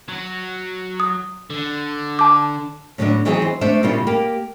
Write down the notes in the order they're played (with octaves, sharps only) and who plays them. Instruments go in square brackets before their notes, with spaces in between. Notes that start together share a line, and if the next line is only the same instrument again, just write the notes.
[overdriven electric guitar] F#3
[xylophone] D#6
[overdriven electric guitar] D3
[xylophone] A5 D6
[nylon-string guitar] A2 D3 F#3 A3 B3 D4
E3 F#3 B3 C4 D#4 G#4
C5
A3 B3 D4 C5 E5
A#2 C#3 G3 B3 E4 F4
A#3 G4